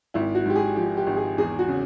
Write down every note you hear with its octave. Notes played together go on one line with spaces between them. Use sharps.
G#1 E4
F#4
G#2 G4
G#4
F3 G4
G4
G#1
G#4
E2 G#4
F#4
C#3